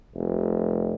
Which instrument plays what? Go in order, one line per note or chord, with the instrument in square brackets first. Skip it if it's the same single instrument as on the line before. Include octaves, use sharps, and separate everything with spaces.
[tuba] F1